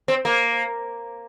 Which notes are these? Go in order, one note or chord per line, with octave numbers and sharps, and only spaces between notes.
C4
A#3